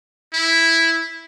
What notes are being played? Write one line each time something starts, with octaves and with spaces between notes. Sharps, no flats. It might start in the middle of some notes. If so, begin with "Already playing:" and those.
E4